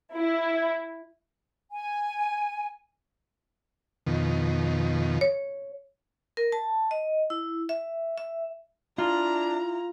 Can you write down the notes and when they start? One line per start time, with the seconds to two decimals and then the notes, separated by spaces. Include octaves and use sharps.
0.15 E4
1.71 G#5
4.07 F2 B2 D#3
5.21 C#5
6.37 A#4
6.52 A5
6.91 D#5
7.30 E4
7.69 E5
8.18 E5
8.98 D4 E4 F4 A#5